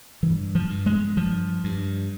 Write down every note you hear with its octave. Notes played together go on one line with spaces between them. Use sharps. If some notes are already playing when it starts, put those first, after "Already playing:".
G2 E3
F3
G2
G#3
G2 F3
G2